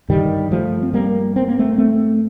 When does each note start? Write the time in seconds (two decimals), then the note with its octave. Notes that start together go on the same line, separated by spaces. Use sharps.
0.09 G2 D3 D#3 G3
0.52 F3 A3
0.83 C4
0.93 G3 A#3
1.36 C4
1.48 A#3
1.59 A3 C4
1.78 A3 C4